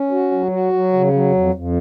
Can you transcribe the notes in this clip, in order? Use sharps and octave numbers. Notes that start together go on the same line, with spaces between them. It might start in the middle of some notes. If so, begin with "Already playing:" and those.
Already playing: C#4
F#4
F#3
F#4
F#3
C#3
F#3
F2
F2